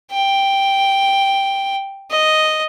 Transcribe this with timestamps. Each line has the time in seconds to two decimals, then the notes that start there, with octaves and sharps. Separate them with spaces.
0.12 G5
2.11 D#5